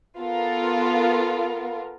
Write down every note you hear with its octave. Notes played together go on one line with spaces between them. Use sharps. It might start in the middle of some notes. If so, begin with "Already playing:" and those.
B3 F4 A4 A#4